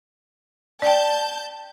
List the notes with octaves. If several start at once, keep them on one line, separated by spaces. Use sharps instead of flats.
D5 G5 A5 G6